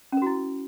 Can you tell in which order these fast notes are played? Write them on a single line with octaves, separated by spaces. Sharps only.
C#4 A#4 F#4 E4